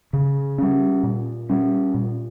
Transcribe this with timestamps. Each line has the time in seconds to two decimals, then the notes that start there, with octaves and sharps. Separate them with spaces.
0.13 C#3
0.58 G3 C#4
1.03 A#2
1.50 G3 C#4
1.94 A#2